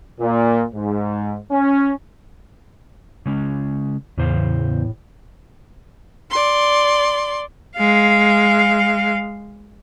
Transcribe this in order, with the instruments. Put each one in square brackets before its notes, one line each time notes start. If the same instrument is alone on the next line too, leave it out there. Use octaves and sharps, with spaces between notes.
[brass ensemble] A#2
G#2
C#4
[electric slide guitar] C#3 G#3 C#4
[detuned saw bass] E2 [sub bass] A2 [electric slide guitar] C#3 C5 F5
[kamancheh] D5 C6
[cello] G#3 F5